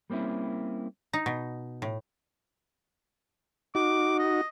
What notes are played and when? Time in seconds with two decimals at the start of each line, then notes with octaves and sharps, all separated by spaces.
0.10 G3 A#3 C4 C#4 E4
1.13 D#4
1.26 B2
1.82 A2
3.75 D#4 F#4 D6
4.19 D#5